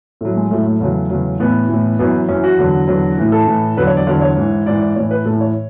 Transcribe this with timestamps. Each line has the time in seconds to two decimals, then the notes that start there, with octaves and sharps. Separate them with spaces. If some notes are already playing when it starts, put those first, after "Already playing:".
0.21 A2 F#3 A3
0.36 G#3
0.51 A2 F#3 A3
0.66 A3
0.80 E2 C#3 F#3
1.10 E2 C#3 F#3
1.40 A2 E3 B3
1.69 A2 E3
1.99 F#2 E3 B3
2.28 F#2 E3 C#4
2.44 F#4
2.58 E2 D3 F#3
2.88 E2 D3 F#3
3.18 A2 E3
3.32 A4
3.47 A2 E3
3.77 E2 D3 F#3 B4
3.87 C#5
3.97 D5
4.07 E2 D3 F#3 C#5
4.21 C#5
4.37 G#2 E3
4.66 G#2 E3 D5
4.81 D5
4.96 A2 E3 C#5
5.11 B4
5.25 A2 E3 A4
5.41 C#5